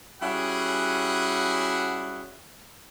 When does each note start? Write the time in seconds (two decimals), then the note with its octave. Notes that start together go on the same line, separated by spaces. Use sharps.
0.22 G3 C#4 E4 F#4 G#4 F#5